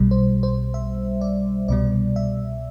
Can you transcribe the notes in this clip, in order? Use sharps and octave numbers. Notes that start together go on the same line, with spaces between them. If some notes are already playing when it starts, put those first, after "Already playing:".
Already playing: B1 B2 G3
C5
C5
E5
D5
C2 B2 G3 D5
E5